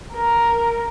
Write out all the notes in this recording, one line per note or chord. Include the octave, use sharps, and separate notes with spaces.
A#4